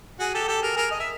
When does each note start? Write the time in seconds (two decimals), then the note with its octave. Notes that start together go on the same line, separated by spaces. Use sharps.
0.20 F#4 G#4
0.34 G4 A4
0.48 G4 A4
0.62 G#4 A#4
0.76 G#4 A#4
0.91 D#5
1.00 E5